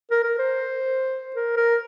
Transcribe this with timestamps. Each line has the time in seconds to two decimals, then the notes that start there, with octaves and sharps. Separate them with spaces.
0.11 A#4
0.24 A#4
0.39 C5
1.36 A#4
1.57 A#4